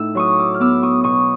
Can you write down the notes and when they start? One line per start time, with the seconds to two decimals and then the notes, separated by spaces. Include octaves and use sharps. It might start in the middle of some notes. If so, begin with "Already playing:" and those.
Already playing: A2 D#4 E6
0.15 F#3 C#6 D#6
0.39 D6 E6
0.54 F6
0.60 B3 D6 E6
0.83 C#6 D#6
1.03 B2 C#6 D#6